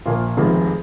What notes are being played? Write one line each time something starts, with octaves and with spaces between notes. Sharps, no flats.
A#1 A#2 F3 A#3 F4
F1 F2 C3 D#3 G#3